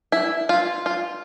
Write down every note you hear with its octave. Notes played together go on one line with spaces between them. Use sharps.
E4
F4
F4